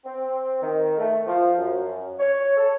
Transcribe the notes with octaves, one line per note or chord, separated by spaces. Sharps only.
C4
D#3
A3
F3
F#2
C#5
A4